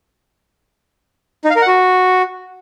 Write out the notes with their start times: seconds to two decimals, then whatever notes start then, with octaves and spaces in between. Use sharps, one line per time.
1.44 D#4
1.50 F5
1.56 A#4
1.61 F#5
1.67 F#4